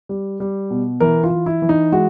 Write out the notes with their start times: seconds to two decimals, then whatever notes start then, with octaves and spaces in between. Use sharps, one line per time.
0.09 G3
0.40 G3
0.71 B2
1.00 E3 A#4
1.24 F4
1.31 E3
1.46 E4
1.62 E3
1.69 D#4
1.92 G#3 F#4